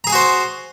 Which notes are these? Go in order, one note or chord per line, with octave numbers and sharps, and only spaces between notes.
F#4 G#4 C5 G#5 A#5